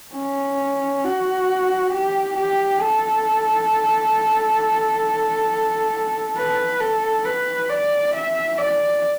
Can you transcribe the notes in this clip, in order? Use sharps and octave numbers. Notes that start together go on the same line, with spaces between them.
C#4
F#4
G4
G4
A4
B4
A4
B4
D5
E5
D5